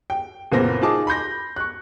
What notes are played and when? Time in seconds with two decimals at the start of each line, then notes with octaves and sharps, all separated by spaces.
0.10 G5
0.52 F#1 A#2 B3 C4 A#4 A#6
0.82 D#4 F4 G#4 A5 D6
1.07 B5 C6 G6 A#6
1.56 C#6 F#6